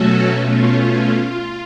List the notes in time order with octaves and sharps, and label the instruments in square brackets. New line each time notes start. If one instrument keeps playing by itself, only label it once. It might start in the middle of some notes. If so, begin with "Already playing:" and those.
Already playing: [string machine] B2 F#3 A3 C#4 F#4 A4
B2 A3 C#4 F4